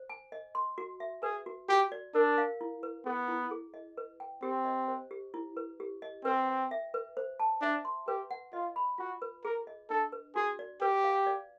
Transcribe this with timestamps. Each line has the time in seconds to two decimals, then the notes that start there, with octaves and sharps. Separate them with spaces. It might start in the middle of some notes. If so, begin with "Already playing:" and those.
Already playing: C5
0.10 G#5
0.32 D#5
0.55 C6
0.78 F#4
1.00 E5
1.23 G#4 B4
1.46 F#4
1.69 F#4 G4
1.92 D5
2.14 D4 A#4
2.38 F5
2.61 E4
2.83 B4
3.06 B3 G#4
3.28 E4
3.51 G#4
3.74 D#5
3.97 B4
4.20 G5
4.43 C4 G4
4.65 D#5
4.88 C5
5.11 G4
5.34 E4
5.57 B4
5.80 G4
6.02 D#5
6.25 C4 B4
6.48 G5
6.71 E5
6.94 B4
7.17 C5
7.40 A5
7.62 D4 E5
7.85 C6
8.08 G4 B4
8.31 F#5
8.53 F4 D#5
8.76 B5
8.98 F4 F#4
9.22 B4
9.45 G#4 A#4
9.67 D#5
9.90 D4 A4
10.12 B4
10.36 F#4 G#4
10.59 D5
10.82 G4 B4
11.04 F5
11.27 D5